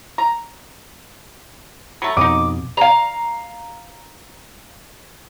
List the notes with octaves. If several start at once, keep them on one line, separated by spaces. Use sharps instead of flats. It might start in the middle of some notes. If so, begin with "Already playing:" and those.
A#5
F#3 A3 A#5 B5
F2 B2 D#4 D#5 D6
F5 A#5